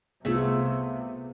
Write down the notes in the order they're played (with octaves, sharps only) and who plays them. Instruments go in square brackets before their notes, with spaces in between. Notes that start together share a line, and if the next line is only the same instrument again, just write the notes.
[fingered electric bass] C2 [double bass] C3 [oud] A3 G#4 E5 [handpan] B3 F4